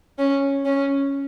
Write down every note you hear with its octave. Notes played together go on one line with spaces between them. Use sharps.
C#4
C#4